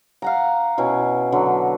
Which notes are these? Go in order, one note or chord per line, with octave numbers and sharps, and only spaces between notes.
F5 F#5 A#5
B2 C#4 E4
D3 F#3